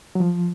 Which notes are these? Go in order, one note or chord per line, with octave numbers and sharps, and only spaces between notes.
F#3
F3